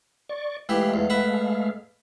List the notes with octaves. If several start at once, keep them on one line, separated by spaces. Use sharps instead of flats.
D5 C#6
E3 G#3 A3 E4 G4 F5
E2
B4 E5 F#5